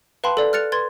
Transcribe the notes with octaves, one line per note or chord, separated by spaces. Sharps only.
B4 F5 G5 A5 B5 C6
A4 D5
F6 F#6 A6 C#7 F7
B4 C6 G#6 A6